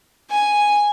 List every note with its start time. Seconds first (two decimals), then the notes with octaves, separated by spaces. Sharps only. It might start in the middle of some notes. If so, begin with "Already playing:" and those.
0.30 G#5